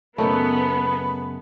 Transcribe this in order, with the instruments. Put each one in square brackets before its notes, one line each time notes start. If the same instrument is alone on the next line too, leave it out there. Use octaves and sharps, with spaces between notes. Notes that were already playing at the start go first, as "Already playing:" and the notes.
[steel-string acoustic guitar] F#2 C#3 [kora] A3 D#4 [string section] B3 [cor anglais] B4